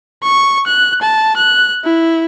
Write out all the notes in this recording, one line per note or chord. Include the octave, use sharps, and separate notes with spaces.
C#6
F#6
A5
F#6
E4